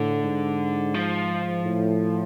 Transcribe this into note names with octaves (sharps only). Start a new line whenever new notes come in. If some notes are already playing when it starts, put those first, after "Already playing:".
Already playing: A2 D3
G#2
F3
A2